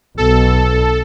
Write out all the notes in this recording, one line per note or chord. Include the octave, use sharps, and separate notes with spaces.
B1 B2 A4